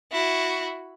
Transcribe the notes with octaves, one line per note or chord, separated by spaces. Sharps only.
E4 F#4